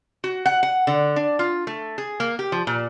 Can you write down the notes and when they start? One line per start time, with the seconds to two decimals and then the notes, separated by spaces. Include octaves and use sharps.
0.24 F#4
0.46 F#5
0.63 F#5
0.87 D3
1.16 D4
1.39 F4
1.67 A3
1.98 G#4
2.20 A#3
2.39 G4
2.52 F3
2.67 A#2